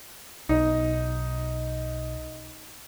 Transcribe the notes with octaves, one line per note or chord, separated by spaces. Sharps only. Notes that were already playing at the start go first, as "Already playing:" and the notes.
B1 D#4